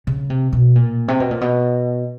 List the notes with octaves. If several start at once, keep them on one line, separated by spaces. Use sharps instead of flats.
C#3
C3
B2
A#2
C3
B2
A#2
B2